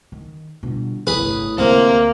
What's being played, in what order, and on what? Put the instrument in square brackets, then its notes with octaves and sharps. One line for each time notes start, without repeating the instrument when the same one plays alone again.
[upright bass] D#3
[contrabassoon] G1 [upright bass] B2
[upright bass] G1 C2 [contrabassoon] A2 [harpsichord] G#4 B4
[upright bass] D2 F4 [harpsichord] C3 [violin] A#3